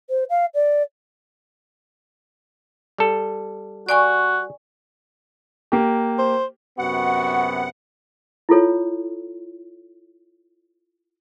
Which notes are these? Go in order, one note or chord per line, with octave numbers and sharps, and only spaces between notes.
C5
F5
D5
G3 A4
F#4 D5 G#5 C#6
A#3 G4
C5
F#2 C3 B3 F#4 F#5
E4 F4 A4 C#5